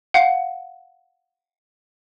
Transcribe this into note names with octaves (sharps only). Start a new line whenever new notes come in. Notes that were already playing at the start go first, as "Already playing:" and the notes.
F5 F#5